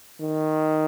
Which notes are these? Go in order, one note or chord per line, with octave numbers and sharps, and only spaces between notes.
D#3